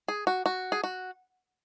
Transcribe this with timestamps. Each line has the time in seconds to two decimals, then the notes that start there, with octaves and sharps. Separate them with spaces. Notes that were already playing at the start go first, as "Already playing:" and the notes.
0.08 G#4
0.27 F#4
0.46 F#4
0.72 G#4
0.84 F#4